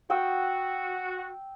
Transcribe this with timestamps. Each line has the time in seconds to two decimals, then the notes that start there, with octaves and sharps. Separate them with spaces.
0.10 F#4 G5 D#6 E6